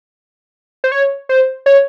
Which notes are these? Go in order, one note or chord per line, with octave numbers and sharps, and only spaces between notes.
C5
C#5
C5
C#5